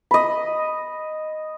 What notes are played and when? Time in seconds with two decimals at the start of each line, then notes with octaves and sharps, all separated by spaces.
0.11 D#5 B5